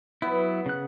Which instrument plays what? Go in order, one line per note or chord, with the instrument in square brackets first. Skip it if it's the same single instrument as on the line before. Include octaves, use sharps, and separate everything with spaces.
[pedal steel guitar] F#3 E4 [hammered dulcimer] B3
[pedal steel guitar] C#3 F#6